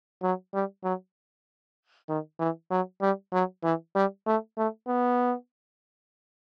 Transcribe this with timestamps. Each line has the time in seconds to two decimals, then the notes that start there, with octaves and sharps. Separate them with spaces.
0.22 F#3
0.54 G3
0.84 F#3
2.09 D#3
2.39 E3
2.71 F#3
3.01 G3
3.33 F#3
3.63 E3
3.95 G3
4.26 A3
4.58 A3
4.87 B3